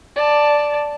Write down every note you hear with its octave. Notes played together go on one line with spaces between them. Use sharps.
D5 A5